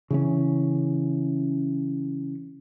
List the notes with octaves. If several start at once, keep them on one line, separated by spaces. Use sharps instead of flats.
C#3 E3 C#4